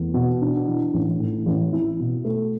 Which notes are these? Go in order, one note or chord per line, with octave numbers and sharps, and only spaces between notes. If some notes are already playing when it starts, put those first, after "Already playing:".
Already playing: E2 A3
B2
D4
E3
A1
A2
A1
E4
B2
A3